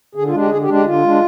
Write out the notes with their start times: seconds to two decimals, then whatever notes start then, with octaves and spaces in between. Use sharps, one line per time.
0.15 D3 G#4
0.27 F4
0.32 G#3 D4
0.38 G4
0.49 D3 G#4
0.62 G4
0.67 G#3 D4
0.74 G4
0.85 D3 F4
1.03 G#3 D4